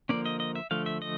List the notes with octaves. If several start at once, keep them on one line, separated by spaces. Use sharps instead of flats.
D3 F3 A#3 C#4 D5
D#5
D#5
E5
D3 F3 A3 F5
E5
D#5